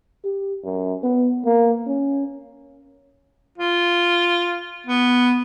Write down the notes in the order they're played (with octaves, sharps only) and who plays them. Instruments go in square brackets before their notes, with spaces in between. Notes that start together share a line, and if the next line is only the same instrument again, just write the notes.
[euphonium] G4
F#2
B3
A#3
C#4
[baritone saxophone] F4
B3